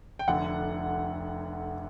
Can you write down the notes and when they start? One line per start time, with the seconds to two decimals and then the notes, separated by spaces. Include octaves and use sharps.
0.19 G5
0.28 F1 F2 D3 F#5